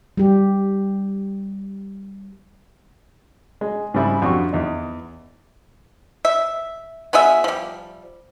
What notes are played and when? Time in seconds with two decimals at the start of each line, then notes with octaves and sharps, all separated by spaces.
0.17 G3 G4
3.61 G#3
3.94 G#2 C#3 G3 E4
4.22 F2 D4 F#4 G4 C#6
4.53 E2 D#4
6.25 E5
7.13 B3 F4 G#4 E5
7.44 F3 G3